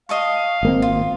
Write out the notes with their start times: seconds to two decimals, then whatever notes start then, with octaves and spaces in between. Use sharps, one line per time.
0.09 D#5 F5 A5 C#6
0.63 G#1 A#3 C4
0.82 F4